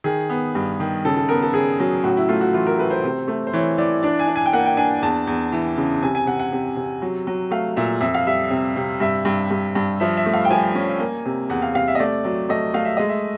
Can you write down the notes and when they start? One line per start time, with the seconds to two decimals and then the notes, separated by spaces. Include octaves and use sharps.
0.04 D#3 G#4
0.30 B3
0.55 G2
0.80 D#3
1.05 C#3 A4
1.17 A4
1.29 B3 A#4
1.42 A4
1.54 C#3 G#4
1.79 F#3 G#4
2.03 A2 F#4
2.17 E4
2.29 A3 F4
2.41 F#4
2.54 E3 F4
2.67 A#4
2.78 A3 B4
2.90 C5
3.04 C3
3.28 A3
3.47 C5
3.53 E3 C#5
3.78 E3 D5
4.03 D4 D5
4.19 G#5
4.28 D4
4.36 G#5
4.46 G5
4.53 A#3 F#5
4.66 G5
4.77 D4 G#5
5.02 E2 A5
5.27 E2
5.52 E3
5.77 C#3
6.03 C3 G#5
6.15 G#5
6.26 C3 F#5
6.40 F#5
6.52 C3
6.76 C3
7.02 F#3
7.27 F#3
7.51 A3 F5
7.76 A#2 E5
8.01 F2 E5
8.14 F5
8.27 G3 E5
8.50 C3
8.76 C3
9.00 G2 E5
9.25 G2
9.50 G2
9.75 G2
10.00 F3 E5
10.17 E5
10.26 A3
10.33 F5
10.45 G5
10.50 F3 G#5
10.75 C#4
10.99 A#3
11.25 C3
11.49 E2 F#5
11.62 F5
11.74 C3 F5
11.88 E5
11.95 D#5
11.99 A3 D5
12.24 F#3 D5
12.49 A3 D#5
12.74 A3 F5
12.85 E5
12.97 G#3 D#5
13.09 E5